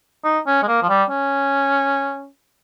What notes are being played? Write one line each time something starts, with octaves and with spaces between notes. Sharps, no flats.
D#4
C#4
G#3
A#3
F3
G3
C#4